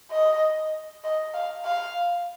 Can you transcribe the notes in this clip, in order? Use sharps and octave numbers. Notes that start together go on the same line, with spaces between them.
D#5
D#5
F5
F5